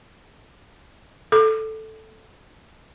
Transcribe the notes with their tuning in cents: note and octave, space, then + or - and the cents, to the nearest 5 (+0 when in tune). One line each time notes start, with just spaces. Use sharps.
A4 +0 D6 +30